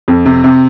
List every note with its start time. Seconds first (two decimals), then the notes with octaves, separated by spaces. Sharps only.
0.08 F2
0.26 C3
0.44 C3